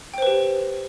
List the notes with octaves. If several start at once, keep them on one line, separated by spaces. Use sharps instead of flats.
G4 B4 C5 G5